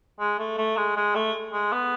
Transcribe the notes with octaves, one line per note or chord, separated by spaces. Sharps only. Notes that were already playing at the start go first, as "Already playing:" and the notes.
G#3
A3
A3
G#3
G#3
A3
G#3
B3